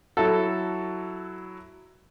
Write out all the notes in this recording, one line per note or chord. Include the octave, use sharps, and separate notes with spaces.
F#3 E4 F#4 A4